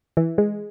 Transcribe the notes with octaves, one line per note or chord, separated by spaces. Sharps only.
E3
G#3